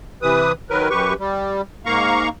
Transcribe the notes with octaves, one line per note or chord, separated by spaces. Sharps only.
C3 E3 B4 D#6
D#3 F#3 A#4 B4
F#2 G4 B4 C#6
G3
G#2 A#3 F5 A#5 C#6